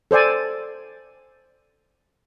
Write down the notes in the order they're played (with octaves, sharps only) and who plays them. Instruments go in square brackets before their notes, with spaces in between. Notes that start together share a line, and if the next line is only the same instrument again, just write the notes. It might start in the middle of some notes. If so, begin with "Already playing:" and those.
[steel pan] A4 C5 D5 G#5